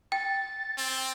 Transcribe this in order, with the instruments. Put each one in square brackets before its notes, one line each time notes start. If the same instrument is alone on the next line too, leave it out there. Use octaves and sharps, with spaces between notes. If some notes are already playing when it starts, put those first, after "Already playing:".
[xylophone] G5 [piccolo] A6
[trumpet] C4